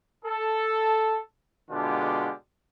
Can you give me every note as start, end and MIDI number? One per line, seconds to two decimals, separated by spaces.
0.25 1.19 69
1.70 2.32 47
1.70 2.32 50
1.70 2.32 56
1.70 2.32 62
1.70 2.32 65
1.70 2.32 67